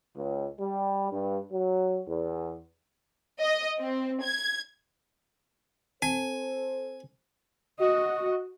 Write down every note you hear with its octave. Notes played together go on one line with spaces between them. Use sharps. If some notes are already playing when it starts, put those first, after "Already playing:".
C#2
G3
G2
F#3
E2
D#5
C4
G#6
C4 A4 C5 G#5
F#4 D#5